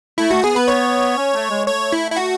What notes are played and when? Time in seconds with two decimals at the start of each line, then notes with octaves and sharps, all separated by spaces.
0.18 A3 E4
0.30 A3 F#4
0.43 B3 G#4
0.55 B3 B4
0.68 C#5
1.17 C#4
1.34 A3
1.50 G#3
1.67 A3 C#5
1.92 E4
2.11 E4
2.16 F#4